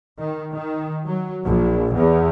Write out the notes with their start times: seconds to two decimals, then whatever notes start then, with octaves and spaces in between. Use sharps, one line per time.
0.19 D#3
0.54 D#3
1.06 F#3
1.44 A#1
1.96 E2